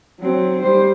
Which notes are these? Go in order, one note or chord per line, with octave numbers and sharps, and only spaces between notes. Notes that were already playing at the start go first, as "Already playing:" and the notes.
F#3 C4
G3 C5